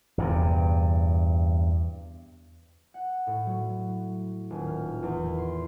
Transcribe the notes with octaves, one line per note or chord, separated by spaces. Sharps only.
E2 G2 C3
F#5
A2
F#3
D#1
F6
E2
C6